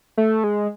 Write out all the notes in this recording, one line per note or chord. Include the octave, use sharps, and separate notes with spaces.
A3
G#3